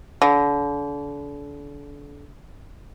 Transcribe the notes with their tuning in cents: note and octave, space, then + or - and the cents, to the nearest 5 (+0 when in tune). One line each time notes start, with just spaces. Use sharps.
D3 -35